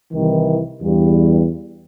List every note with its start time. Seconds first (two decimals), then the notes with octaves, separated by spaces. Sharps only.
0.13 C2 D#3 E3
0.81 E2 G2 G3